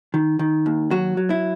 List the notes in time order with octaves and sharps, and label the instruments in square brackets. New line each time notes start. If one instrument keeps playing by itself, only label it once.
[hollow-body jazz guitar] D#3
D#3
D#2
F#3 F#4
F#3
E4